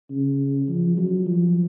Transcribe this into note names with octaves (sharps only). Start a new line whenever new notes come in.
C#3
F3
F#3
F3